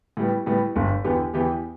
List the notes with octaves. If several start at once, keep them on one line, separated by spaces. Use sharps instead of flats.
A2 G3 B3
A2 G3 B3
G1 G2 D3
E2 D3 B3 G4
E2 E3 B3 G4